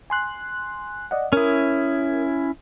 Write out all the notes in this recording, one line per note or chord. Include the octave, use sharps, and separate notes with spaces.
G#5 C6 F#6
D5 D#5 F#5
C#4 E4 A#4 D#6